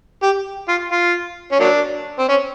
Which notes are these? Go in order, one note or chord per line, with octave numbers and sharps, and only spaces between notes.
G4
F4
F4
C#4
F#3 A#3 D4
C4
C#4